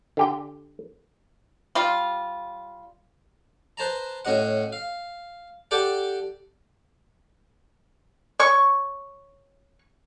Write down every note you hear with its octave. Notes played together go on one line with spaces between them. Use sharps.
D3 G4 G5
G3 F4
B4 C5 A5 A#5
A2 C#4 F#4 D#5 F#5
F5
G4 A4 D5 F#5 G5
C#5 C#6